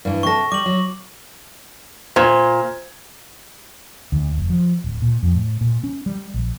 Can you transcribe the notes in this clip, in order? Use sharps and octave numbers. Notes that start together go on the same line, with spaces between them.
G2 E3
C3 A4 C#6 A#6
G3 D6 F#7
F#3
A#2 C5 G#6 E7
D2
F1
F3
D1
A#2
F2
A2
A#2
C#4
G3
A#1